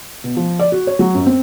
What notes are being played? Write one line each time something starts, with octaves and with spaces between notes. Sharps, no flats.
B2
F3
D5
F#4
C#5
F#3
F#2
C4